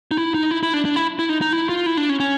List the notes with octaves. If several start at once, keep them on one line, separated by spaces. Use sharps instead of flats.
D#4
E4
D#4
E4
E4
D4
D4
E4
E4
D#4
D#4
E4
F4
E4
D4
C#4
C#4